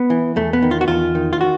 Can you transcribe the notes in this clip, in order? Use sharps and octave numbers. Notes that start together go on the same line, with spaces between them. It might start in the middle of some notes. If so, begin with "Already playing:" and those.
Already playing: B3
E3
E2 A3
B3
D#3
F4
F#4
E2 F4
D#3
F4
F#4